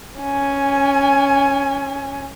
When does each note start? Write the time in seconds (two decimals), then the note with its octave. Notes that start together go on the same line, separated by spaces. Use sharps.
0.21 C#4 G#5